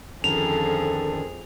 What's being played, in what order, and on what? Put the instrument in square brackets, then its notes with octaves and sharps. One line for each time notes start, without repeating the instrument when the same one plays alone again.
[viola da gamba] F2 F3 G#4 [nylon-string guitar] D3 D#3 C#4 [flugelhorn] A4 [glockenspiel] F7